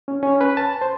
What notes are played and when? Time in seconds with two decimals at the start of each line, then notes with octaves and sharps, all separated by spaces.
0.08 C#4
0.23 C#4
0.41 B4
0.57 A5
0.81 C5